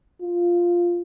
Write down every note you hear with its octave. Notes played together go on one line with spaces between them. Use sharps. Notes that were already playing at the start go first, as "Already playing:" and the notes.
F4